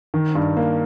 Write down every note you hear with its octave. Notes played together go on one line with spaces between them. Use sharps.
D#3
G2
A#3